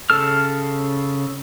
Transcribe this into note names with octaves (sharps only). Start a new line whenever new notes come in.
C#3 A4 F6